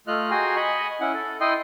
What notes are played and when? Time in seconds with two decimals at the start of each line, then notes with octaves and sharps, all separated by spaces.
0.07 A3 F4 D#5 F6 F#6
0.30 F#4 G#4 G5 G#5 A#5 C6
0.56 D#5 G#5 B5 C#6
1.01 C#4 E4 F#5
1.13 A4
1.41 E4 D#5 G5 C6 D#6